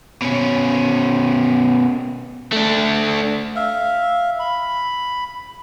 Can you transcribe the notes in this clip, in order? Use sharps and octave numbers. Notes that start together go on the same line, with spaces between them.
B2 C#4
A3 D4
E5 F5
B5